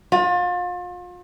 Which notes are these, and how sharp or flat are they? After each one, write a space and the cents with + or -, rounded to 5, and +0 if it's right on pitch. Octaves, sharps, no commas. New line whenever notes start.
F4 +35